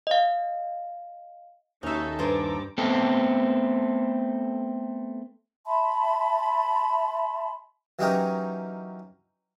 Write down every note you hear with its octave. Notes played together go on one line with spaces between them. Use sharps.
D#5 F5
D#2 C#4 D#4 F#4 A4 E5
G2 C5 G#5 A#5 D6
A3 B3 C4 A4
E5 A5 B5 C6
E3 F#3 C#4 D#4 G4 A#4